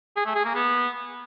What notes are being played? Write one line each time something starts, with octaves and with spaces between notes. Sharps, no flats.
G#4
A3
G#4
A#3
B3